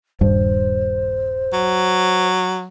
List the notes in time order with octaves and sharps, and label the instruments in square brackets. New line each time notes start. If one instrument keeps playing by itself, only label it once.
[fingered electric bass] D#1 G2 [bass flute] C5
[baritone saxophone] F#3